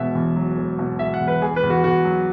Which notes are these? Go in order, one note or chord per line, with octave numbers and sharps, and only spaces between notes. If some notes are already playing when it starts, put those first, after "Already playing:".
Already playing: E1 B2 E5
E2
F#3
E1
B2
E1 E5
F#5
E2
B4
E2 G#4
B4
E2
F#4
E2 F#4
F#3